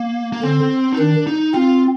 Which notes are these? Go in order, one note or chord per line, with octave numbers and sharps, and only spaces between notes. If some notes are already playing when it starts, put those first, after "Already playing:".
Already playing: A#3
A#3
D3 C4
D#4
D#3 D4
D#4
C4 F4